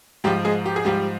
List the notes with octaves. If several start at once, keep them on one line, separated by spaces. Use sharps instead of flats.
G#2 F3 G3 G4
G#3 G#4
G4
G#4
G#2 F3 G3 G4